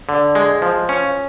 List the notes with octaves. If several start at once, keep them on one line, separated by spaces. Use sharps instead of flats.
D3
G#3
F3
C#4